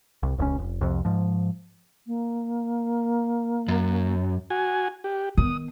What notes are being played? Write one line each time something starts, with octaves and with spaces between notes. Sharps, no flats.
C2
D#1 C#2 B2 C#4
F1
C2 F2
G#2 F3
A#3
F#2
F#4 G#5
G4
D#3 B3 D#6